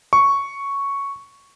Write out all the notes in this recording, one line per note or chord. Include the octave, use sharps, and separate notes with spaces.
C#6